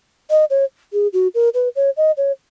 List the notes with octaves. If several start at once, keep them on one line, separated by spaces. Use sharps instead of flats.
D#5
C#5
G#4
F#4
A#4
B4
C#5
D#5
C#5